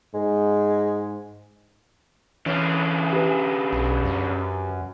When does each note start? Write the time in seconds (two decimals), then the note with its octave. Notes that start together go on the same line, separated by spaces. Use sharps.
0.14 G#2 G#3
2.46 D3 E3 C#4
3.13 G4 B4
3.73 B1
4.05 F#2